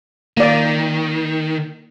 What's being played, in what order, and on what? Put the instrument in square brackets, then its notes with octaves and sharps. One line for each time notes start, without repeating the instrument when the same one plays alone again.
[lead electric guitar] D#3 [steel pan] A#3 D5